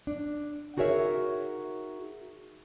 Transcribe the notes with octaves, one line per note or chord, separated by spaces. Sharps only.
D4
D#4 F#4 G#4 A#4 C#5 E5